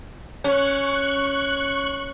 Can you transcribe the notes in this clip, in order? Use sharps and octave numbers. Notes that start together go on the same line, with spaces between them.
C#4 C#6 F#6